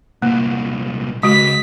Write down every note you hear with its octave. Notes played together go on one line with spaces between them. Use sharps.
C2 A#2 A#3
C#2 G#3 F#4 B6